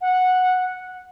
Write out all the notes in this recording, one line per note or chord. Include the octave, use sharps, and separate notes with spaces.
F#5